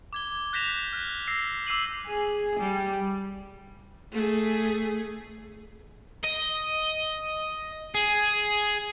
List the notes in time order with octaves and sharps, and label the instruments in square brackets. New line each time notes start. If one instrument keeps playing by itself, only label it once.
[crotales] D6 G#6 G7
F#6 G6 A#6 B6 E7 F7
F6 F#6
E6 A#6 C7
D6 E6 C7 D#7 F#7
[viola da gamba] G#4
G3
[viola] A3 G#4
[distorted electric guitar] D#5
G#4